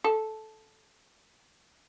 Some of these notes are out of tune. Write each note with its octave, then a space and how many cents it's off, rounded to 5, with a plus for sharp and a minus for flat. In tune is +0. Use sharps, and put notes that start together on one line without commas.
A4 -10